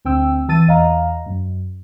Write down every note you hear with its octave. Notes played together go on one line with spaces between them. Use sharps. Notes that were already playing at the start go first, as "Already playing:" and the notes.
D2 C4 G5 E6
E3 A5 E6 A6 D#7
E2 D#5 F5 A#5
F#2